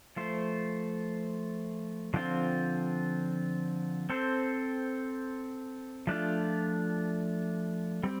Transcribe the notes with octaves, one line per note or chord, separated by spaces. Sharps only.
F3 A3 F4 C5
D3 F3 C4 F4
C4 A4 C5
F3 A3 D4 F4
G3 C4